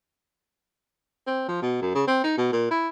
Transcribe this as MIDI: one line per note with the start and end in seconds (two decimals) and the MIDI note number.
1.27 1.45 60
1.48 1.61 53
1.62 1.80 47
1.82 1.93 42
1.95 2.03 49
2.07 2.19 60
2.24 2.35 63
2.37 2.49 47
2.52 2.70 46
2.71 2.88 64